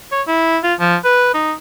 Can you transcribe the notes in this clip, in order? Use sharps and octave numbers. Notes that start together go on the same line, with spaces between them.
C#5
E4
F4
F3
B4
D#4